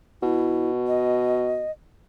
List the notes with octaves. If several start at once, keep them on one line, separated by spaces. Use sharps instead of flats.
B2 E4
D#5